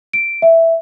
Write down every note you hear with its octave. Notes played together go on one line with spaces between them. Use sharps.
D7
E5